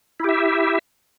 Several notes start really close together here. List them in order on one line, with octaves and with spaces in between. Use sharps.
E4 G4 E5